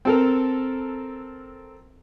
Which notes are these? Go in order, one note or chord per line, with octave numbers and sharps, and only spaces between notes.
C4 A4 A#4